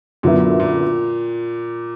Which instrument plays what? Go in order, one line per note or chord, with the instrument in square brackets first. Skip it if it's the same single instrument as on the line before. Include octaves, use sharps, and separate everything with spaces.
[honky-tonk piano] F#2 D3 F#3 B3 E4 [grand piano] A#2
[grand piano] A#2